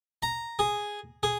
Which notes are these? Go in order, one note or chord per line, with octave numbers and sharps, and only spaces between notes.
A#5
G#4
G#4